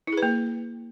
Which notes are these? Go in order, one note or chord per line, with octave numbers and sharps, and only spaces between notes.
E4
G#4
B4
A#3